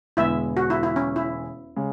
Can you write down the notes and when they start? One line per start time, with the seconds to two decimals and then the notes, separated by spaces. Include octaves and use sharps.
0.17 E1 E2 D3 G#3 B3 E4 E5
0.57 F#4
0.70 E4
0.83 E4
0.96 C#4
1.16 E4
1.76 C#3 G#3